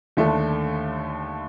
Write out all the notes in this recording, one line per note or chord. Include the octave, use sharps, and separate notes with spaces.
D#2 D3 A3